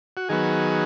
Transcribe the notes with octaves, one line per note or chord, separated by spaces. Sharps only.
F#4
D#3 F#3 B3 G#4